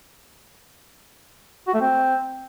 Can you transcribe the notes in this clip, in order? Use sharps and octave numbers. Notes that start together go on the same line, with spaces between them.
F#4
A3
C4